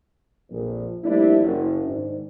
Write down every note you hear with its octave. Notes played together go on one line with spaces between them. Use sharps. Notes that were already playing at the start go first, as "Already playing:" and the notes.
A#1 F2 A#2 F3
F3 G3 A3 A#3 D4 E4
F#1
G#2 D#3 D4